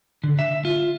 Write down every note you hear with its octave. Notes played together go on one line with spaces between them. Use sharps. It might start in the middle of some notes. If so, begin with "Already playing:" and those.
D3
E5
F4